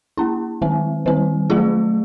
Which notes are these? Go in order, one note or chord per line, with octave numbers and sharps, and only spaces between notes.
A#3 C#4 E4
D#3 G#3 C4
D#3 G3 C4
F#3 A3 C#4 F4 G#4